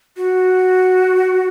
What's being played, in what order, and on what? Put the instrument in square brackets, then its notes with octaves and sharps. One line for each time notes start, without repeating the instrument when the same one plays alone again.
[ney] F#4